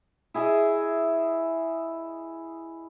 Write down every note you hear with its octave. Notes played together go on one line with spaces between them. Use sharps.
E4 G#4 D#5 E5